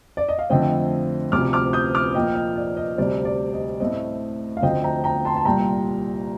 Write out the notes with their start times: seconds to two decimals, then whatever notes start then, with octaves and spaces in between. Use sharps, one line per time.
0.17 D5
0.29 D#5
0.39 F5
0.50 F2 D3 A3 C4 D#5 G5
1.32 D2 C3 F3 D6 F6
1.53 D6 F6
1.73 D#6 G6
1.95 D6 F6
2.15 A#2 F3 A#3 D#5 G5
2.35 D#5
2.56 D5
2.77 D#5
2.98 D2 C3 G3 C4 D5
3.25 D5
3.53 D#5
3.80 A2 A3 C4 D#5
4.57 F5
4.62 D2 D3 F3 A3 C4 D#5 G5
4.84 G5 A#5
5.04 G5 A#5
5.25 A5 C6
5.36 A5
5.45 C2 A#2 G3 G5 A#5